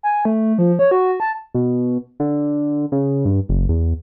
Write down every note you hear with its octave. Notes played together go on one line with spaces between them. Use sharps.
G#5
A3
F3
C#5
F#4
A5
B2
D3
C#3
G2
F#1
E2